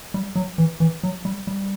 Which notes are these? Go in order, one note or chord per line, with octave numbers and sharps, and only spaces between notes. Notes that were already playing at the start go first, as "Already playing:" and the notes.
G3
F#3
E3
E3
F#3
G3
G3